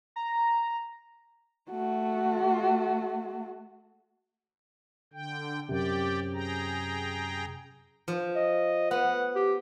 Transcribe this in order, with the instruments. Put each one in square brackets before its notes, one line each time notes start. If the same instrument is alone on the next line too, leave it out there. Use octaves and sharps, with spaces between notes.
[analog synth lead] A#5
[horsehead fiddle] A3 F#4
[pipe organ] D3 G5
[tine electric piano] F#2 C3 [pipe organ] G4 D5 G5
[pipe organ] G#4 G5 A#5
[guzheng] F3
[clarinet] D#5
[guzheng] B3 [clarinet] F#5
[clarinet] G4